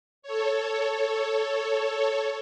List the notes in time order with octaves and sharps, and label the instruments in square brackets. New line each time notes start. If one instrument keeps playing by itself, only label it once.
[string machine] A4 C#5